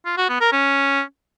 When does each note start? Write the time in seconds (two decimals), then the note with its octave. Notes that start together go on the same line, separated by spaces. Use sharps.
0.06 F4
0.17 F#4
0.29 B3
0.41 A#4
0.52 C#4